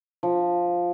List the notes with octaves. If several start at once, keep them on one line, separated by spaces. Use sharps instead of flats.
F3